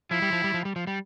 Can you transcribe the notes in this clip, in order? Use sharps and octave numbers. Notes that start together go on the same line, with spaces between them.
F3 E4
G3
F3
G3
F3
G3
F3
G3